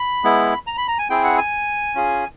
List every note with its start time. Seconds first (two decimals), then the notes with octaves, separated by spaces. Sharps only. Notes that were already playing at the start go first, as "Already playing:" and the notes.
Already playing: B5
0.24 G#3 B3 E4
0.67 A#5
0.77 B5
0.88 A#5
0.99 G#5
1.10 C4 E4 G#4 G5
1.24 F#5
1.38 G#5
1.95 C#4 F4 G#4